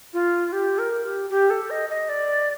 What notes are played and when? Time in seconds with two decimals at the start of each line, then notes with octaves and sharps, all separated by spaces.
0.14 F4
0.52 G4
0.78 A#4
1.04 G4
1.30 G4
1.50 A4
1.70 D#5
1.90 D#5
2.09 D5